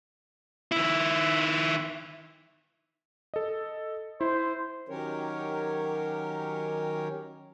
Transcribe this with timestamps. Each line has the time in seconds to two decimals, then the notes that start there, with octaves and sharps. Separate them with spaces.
0.72 D#3 E4
3.34 A4 D#5
4.21 E4 C5
4.89 D#3 F#3 C#4 G4 A#4 C#5